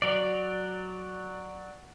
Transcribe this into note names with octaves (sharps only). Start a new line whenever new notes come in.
F#3 D5